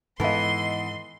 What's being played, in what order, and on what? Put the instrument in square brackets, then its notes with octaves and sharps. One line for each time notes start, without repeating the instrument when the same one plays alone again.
[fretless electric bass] G#2 D#3 [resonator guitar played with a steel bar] E3 B3 [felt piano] A4 D#5 [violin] C6